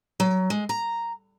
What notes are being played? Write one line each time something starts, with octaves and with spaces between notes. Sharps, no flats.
F#3
G#3
A#5